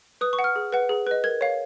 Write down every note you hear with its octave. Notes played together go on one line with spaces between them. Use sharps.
B4 D#6
C#6
F#5
F6
G#4
B4 F#5
G#4
B4 D#5
A#4 G#6
C#5 F5